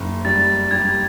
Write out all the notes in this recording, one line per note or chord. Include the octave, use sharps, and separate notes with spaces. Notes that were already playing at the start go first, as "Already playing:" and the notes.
Already playing: F#1
G3 A6
G3 G#6